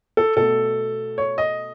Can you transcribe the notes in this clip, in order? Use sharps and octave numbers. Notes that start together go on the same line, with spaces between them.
A4
B2 A3 A4
C#5
D#5